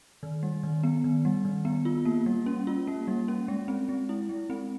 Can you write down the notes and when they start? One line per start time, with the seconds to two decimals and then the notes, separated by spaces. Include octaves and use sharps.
0.23 D#3
0.43 G3
0.63 D#3
0.83 B3
1.04 D#3
1.25 G3
1.45 D#3
1.65 B3
1.85 F4
2.05 A#3
2.26 G3
2.46 C#4
2.67 F4
2.87 A#3
3.08 G3
3.28 C#4
3.48 G#3
3.68 C4
3.89 G#3
4.09 E4
4.29 G#3
4.50 C4